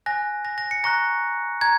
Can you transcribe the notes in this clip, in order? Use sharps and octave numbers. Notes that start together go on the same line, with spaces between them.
G#5 F#6 A#6
A#6
A#6
C#7
A#5 C#6 F#6 A#6
A#5 G#6